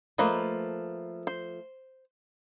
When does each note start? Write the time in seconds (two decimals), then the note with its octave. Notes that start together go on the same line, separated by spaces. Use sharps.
0.18 F3 A3 A#3 B4 D#5
1.27 C5